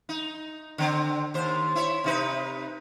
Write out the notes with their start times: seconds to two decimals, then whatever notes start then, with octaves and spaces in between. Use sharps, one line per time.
0.09 D#4
0.78 D3 C4
1.34 D#2 C5
1.75 E4 C#5
2.04 C3 D#4 B4